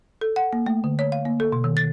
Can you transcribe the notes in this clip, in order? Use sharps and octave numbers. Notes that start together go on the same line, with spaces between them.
A4
F#5
A#3
A3
D3
C#5
F5
A#3
A4
B2
D#3
A6